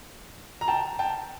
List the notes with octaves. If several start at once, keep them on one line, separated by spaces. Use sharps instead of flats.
A#5
G5 A5
G5 A5